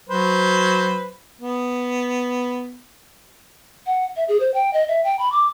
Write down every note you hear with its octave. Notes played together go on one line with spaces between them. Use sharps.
F#3 B4 C5
B3
F#5
E5
G#4
C5
G5
D#5
E5
G5
B5
D6